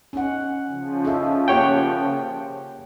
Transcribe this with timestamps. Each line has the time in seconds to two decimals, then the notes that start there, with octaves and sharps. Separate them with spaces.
0.13 C#4 D#4 F#5
0.69 C#3 F3
1.05 D#4 A4 E5
1.48 A#3 G4 C#5 F#5 G5